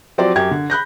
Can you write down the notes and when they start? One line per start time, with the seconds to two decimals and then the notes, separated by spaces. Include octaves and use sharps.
0.18 F3 F#3 C4 G4 D5
0.36 F#2 G4 G#6
0.51 D3
0.70 B5 F#6 G6 A#6